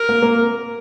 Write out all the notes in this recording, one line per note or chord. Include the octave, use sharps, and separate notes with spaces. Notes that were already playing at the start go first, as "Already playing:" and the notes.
Already playing: A#4
A#3
A#3